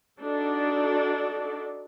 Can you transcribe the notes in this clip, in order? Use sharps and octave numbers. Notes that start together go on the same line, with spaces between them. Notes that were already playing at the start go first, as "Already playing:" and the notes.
D4 D#4 F#4 A4 D5